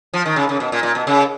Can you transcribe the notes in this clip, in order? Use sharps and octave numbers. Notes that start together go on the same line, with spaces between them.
F3
D#3
C#3
C#3
B2
A#2
A#2
B2
C#3